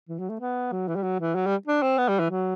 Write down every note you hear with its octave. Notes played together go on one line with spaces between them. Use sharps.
E3
F#3
A3
B3
F#3
E3
G3
F#3
E3
F#3
G3
D4
C4
B3
G3
E3
F#3